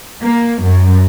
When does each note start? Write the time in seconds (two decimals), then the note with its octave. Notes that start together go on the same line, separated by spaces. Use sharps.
0.23 A#3
0.63 F#2